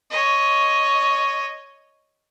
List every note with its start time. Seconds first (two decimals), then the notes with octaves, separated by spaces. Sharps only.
0.10 C#5 D#5